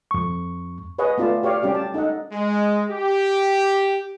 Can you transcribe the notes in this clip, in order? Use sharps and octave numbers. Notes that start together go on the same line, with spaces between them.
F2 C#6
G#4 B4 C#5 D#5 F#5
A3 B3 F4 D5 A5
G4 C#5 D5 F5
G3 C#4 G4 D5
A5
D#4 A4 D#5 F#5
G#3
G4